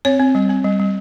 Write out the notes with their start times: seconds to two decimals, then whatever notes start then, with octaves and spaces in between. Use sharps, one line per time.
0.05 C4 C#5
0.20 C4
0.35 G3
0.49 C4
0.64 G3
0.80 G3